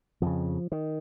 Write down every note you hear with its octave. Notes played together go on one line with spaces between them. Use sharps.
F2 C#3 F3
D#3